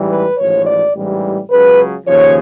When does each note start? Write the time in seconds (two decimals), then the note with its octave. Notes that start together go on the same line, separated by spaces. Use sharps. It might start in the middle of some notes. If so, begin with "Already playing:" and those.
Already playing: A1 G#2 E3 G3
0.09 B4
0.37 A1 G#2 F3 C#5
0.65 D5
0.94 A1 G#2 E3 G3
1.49 C#2 C#3 F#3 B4
2.06 D#2 C#3 F3 C#5